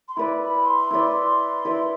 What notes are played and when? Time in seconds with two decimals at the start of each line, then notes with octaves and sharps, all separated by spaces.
0.08 C6
0.17 E4 B4 D5 B5
0.41 B5
0.66 C6
0.91 E4 B4 D5
1.65 E4 B4 D5